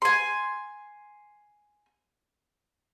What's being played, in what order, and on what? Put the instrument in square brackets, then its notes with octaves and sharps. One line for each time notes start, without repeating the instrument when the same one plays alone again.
[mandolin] G#5 C6